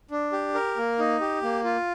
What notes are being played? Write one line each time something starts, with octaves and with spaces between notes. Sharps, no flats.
D4
G4
A#4
A#3
D#4
G4
A#3
F4